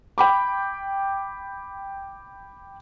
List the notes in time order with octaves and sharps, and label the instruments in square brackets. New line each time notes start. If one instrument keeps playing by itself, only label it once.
[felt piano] G5 B5 D6